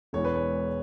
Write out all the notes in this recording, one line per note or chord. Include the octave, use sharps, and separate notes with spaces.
E1 E2 E3 G#3 B3 C#5
B4
C#5